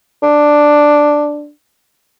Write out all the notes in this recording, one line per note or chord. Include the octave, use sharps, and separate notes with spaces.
D4